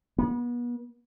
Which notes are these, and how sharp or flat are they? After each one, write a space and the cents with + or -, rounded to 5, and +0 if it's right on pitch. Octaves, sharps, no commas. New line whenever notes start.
B3 -35